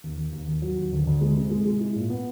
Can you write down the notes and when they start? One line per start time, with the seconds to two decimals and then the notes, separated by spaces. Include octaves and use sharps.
0.03 D#2
0.17 D#2
0.32 D#2
0.48 D#2
0.62 F#3
0.77 D#2
0.92 D2
1.07 D2
1.21 G#3
1.37 C3
1.51 G#3
1.66 G#3
1.80 E4
1.95 A#2
2.10 B3